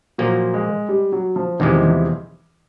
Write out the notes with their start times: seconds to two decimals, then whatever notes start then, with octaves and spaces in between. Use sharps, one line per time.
0.18 A#2 F3 F#3 A#3
0.54 G#3
0.89 G3
1.12 F#3
1.36 F3
1.59 E2 C3 D#3 F3 G#3
1.83 E3